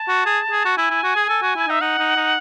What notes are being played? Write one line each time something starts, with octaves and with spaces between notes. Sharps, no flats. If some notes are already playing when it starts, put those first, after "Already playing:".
Already playing: A5
F#4
G#4
G#4
F#4
E4 G#5
E4
F#4
G#4
A4
F#4
E4
D#4 E5
D#4 F#5
D#4
D#4